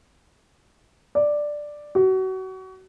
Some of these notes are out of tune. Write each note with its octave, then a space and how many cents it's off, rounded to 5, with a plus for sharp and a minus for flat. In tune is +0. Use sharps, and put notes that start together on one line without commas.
D5 +5
F#4 +30